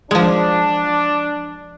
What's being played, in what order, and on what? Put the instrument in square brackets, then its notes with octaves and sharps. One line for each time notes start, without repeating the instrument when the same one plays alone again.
[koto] F3 G#3 [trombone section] D4